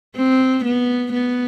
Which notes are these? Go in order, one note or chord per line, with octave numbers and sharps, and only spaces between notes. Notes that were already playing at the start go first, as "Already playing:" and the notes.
C4
B3
B3